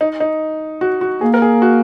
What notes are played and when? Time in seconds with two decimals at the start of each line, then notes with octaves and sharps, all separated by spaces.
0.01 D#4
0.20 D#4
0.81 F#4
1.01 F#4
1.21 A#3 G#4
1.34 A#4
1.42 G#4
1.62 F#4